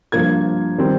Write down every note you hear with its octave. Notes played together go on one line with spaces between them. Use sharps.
G2 F3 A#3 G#6
D#3 G3 C4